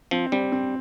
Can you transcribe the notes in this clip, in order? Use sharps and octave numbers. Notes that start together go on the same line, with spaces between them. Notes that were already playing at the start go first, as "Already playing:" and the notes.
F3 C4
G3 C4
C4